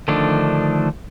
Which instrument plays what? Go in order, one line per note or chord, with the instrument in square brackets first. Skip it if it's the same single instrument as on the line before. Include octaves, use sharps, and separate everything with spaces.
[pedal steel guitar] D3 D#3 F3 A3 D4